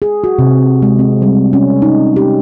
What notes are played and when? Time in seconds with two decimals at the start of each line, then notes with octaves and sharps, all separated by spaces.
0.02 G#4
0.24 F#4
0.39 C3
0.82 G#3
0.99 C4
1.22 G3
1.53 C#4
1.82 D#4
2.16 G4